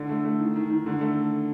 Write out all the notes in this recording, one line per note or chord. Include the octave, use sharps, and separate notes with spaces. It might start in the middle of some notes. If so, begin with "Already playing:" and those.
Already playing: D3
A3
A3
D#3
D#3
D#3
D3
A3